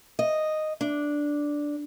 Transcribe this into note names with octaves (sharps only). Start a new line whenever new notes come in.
D#5
D4